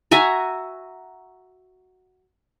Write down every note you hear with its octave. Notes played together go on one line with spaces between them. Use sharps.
F#4 E5 G#5 A#5